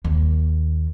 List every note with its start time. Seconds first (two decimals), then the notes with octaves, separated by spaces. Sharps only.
0.04 D#2